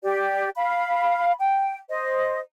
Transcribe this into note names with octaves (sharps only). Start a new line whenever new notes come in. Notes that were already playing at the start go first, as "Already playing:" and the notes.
G4 D5
F5 B5
G5
C5 D#5